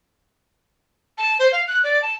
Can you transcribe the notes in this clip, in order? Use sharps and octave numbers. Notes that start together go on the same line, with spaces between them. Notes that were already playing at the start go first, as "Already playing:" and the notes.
A5
C5
F5
F#6
D5
A5